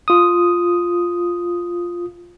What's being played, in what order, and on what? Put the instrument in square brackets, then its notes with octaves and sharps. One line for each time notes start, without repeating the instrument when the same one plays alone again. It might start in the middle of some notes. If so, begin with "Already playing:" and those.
[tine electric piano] F4 D#6